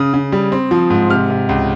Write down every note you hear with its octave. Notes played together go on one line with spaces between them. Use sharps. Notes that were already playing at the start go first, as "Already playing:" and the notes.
Already playing: C#3 D#6
C#3
G3
C4
F3
G#2
C3 F6
C3
C#2